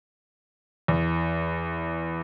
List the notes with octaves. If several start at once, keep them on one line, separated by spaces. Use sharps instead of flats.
E2